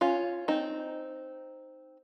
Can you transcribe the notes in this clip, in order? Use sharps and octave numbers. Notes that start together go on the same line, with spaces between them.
C#4 F4
C4 D#4